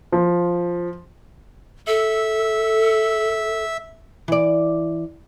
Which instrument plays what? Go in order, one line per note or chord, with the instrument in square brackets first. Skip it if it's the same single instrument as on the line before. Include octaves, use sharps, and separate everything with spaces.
[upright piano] F3
[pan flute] A4 [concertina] E5
[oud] E3 D5